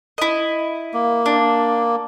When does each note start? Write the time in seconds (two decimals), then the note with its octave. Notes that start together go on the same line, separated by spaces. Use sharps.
0.18 E4 D#5
0.93 A#3
1.26 D4